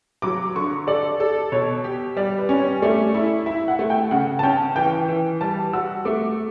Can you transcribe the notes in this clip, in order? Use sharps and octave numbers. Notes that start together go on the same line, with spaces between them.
F#3 D6
D3 C#6
A4 D5
A4
B2 C#5
G4
G3 D5
B4
C#4
C#5
A3 D5
E4
E4 E5
F#5
A3
G5
C#3 F#5
A5
C#4 G5
E3 G5
E3
G3 A5
F#4 E6
A3 D6